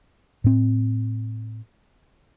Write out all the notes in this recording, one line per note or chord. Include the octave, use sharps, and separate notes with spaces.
A2 C4